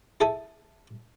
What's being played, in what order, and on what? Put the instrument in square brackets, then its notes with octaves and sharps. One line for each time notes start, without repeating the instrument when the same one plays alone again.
[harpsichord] E4 G#4 A4 G#5 A5